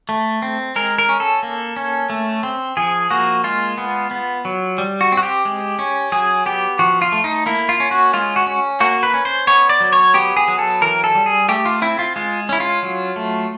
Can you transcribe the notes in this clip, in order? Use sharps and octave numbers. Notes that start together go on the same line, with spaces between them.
A3
C4
G#3 A#4
A#4
C#4
A4
A#3
C#4
A3
C4
F3 G#4
A#3 F#4
G#3 F4
B3
B3
F#3
G3
F#4
C4
F#4
G4
G#3
C#4
F#3 G#4
B3 G4
F3 F#4
F4
A3
D#4
A#3 E4
F4
C#4
F#4
G#3 F4
F#4
C#4
A#3 F#4
B4
C#4
C5
B3 C#5
D5
F#3
C#5
B3 G4
G#4
F#3
A4
E3 A#4
A4
G3
G#4
A3 G4
F4
C4 E4
F4
G#3 F4
C#4 E4
F4
F#3
A3